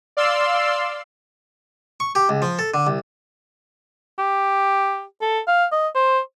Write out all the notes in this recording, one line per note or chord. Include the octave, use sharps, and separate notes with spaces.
D5 F5 C6 E6
C#6
G4
C#2
F3
A4
D3
C2
G4
A4
F5
D#5
C5